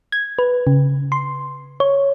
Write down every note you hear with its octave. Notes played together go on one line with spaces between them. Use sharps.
G#6
B4
C#3
C6
C#5